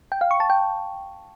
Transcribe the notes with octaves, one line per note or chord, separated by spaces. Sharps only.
G5
F5
C#6
A5
G5